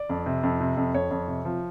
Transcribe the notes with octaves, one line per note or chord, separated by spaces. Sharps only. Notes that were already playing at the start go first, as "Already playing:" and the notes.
Already playing: D5
F2
C3
F2
C3
F2
F2 C#5
F2
C3
F3